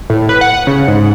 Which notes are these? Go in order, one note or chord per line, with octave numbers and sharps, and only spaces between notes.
A2
B4
F#5
C#3
G#2